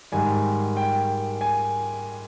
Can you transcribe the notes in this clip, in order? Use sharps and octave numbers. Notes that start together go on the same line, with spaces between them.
G#2 D#3 G3 G#5
G5
G#5